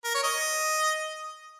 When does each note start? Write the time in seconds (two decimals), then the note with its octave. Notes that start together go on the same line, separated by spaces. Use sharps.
0.04 A#4
0.15 C#5
0.23 D#5